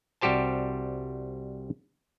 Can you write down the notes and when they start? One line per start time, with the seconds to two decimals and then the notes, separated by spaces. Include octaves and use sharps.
0.21 C2 G3 F#4 G4 C5 A5